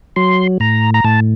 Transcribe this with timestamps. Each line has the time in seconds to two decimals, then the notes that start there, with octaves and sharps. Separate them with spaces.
0.16 F#3 C6
0.60 A2 A#5
0.94 A#5
1.04 A2 A5